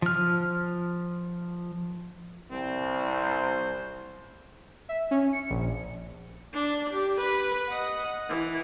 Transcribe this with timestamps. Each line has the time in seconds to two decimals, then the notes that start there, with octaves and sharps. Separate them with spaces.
0.02 F3 F6
2.51 C2 C4
3.14 C5
4.89 E5
5.11 C#4
5.33 C#7
5.50 A#1
6.53 D4
6.90 G4
7.20 B4
7.68 D#5 F#5
8.29 E3